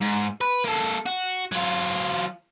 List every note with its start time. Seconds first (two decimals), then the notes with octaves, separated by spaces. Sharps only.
0.01 G#2
0.41 B4
0.65 A#3 A4
1.06 F#4
1.52 F#3 F4